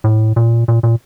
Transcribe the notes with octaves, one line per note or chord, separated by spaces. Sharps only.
A2
A#2
A#2
A#2